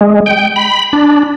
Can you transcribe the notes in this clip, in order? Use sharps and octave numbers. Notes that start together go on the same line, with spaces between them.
G#3
G5
B5
D4